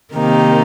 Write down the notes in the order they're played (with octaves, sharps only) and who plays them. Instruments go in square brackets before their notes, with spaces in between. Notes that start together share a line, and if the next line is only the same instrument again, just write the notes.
[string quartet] C3 D#3 A#3 D#4 G4